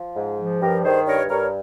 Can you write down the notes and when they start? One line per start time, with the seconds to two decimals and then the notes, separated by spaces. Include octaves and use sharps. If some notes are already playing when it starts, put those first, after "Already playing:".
Already playing: F3
0.16 G#2
0.39 F3
0.62 G2 G4 A#4
0.85 D#3 G#4 C5
1.07 G2 A#4 C#5
1.30 G2 A#4 C#5